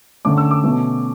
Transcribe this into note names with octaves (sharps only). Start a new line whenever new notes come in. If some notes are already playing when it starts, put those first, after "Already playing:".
D3 A3 C#4 D6
E6
D6
B2 A3 C#4